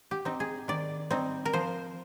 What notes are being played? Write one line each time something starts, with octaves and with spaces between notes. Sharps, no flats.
G4
C4 D#4
G#4
D#3 D5
G3 C4 D#4
A#4
F3 C5